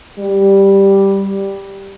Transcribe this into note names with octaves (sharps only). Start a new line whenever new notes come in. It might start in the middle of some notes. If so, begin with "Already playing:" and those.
G3